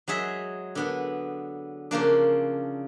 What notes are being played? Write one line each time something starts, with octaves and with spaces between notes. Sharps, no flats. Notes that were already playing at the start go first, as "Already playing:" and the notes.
F#3 G#3 G#4 E5
D3 B3 D4
C#3 F3 A#3 D4